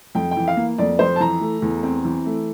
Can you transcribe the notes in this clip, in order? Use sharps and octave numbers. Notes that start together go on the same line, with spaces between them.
F2 G5
G5
E3
F5
A#3
F2 D5
F2 C5
A5
E3 A#5
A3
E2
C4
E3
A3